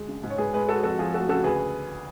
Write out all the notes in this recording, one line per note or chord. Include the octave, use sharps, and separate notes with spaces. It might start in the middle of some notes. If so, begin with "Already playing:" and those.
Already playing: D2 G#3
C#3
G#2
C#5
G#2 G#4 B4
G#3 G#4 B4
G#3 F#4 A4
F2 F#4 A4
F3 F4 G#4
A3 F#4 A4
C#3 F#4 A4
D2 G#4 B4